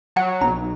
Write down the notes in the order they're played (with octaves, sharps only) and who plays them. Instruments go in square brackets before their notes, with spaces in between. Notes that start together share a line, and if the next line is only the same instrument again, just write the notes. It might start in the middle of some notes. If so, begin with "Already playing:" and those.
[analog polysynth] F#3 [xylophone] F#5
[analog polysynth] B1 [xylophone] A#5